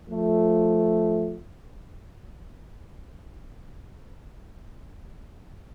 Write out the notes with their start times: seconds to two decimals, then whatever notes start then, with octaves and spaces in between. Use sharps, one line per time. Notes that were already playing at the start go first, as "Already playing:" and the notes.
0.10 F3 A3